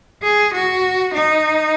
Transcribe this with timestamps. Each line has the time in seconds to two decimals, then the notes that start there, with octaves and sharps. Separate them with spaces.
0.22 G#4
0.53 F#4
1.14 D#4